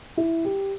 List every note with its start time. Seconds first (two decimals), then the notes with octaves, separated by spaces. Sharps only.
0.17 E4
0.45 G4